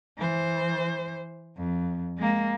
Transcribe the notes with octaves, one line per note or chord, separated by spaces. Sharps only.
E3 C5
F2
G#3 A#3